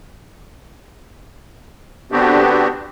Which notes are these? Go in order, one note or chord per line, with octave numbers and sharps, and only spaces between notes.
D3 B3 C4 D4 F#4 G4